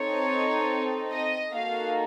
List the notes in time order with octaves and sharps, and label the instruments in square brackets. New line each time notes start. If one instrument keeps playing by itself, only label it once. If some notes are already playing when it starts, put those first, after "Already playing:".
Already playing: [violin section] C4 D#4 A4 C#5
D#5
A#3 D#4 F#4 A4 F5